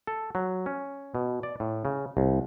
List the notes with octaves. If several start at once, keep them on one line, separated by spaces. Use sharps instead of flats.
A4
F#3
C#4
B2
D5
A2
C#3
C2